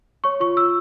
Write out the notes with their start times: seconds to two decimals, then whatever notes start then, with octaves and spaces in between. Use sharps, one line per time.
0.24 C#5 C#6
0.40 F4 C#6
0.56 F4 E6